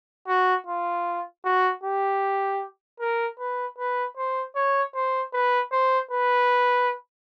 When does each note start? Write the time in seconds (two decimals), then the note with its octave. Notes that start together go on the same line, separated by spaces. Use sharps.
0.28 F#4
0.67 F4
1.45 F#4
1.84 G4
3.00 A#4
3.39 B4
3.78 B4
4.17 C5
4.56 C#5
4.95 C5
5.34 B4
5.72 C5
6.11 B4